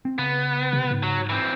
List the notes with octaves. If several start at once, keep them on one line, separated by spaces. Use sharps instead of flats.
C4
C#3 B3
C3
G#2
F#3
E3 C4